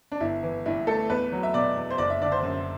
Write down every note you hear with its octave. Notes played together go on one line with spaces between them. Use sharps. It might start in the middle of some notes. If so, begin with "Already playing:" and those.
D4
G1 E4
E3
G2 E4
A3 A4
E2 B4
F#3
E5
B2 D5
E2
C5
F#1 D5
E5
D3 D5
C5
F#2